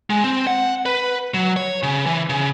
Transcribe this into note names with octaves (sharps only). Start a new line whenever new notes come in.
G#3
C4
F#5
B4
F#3
C#5
C#3
E3
C#3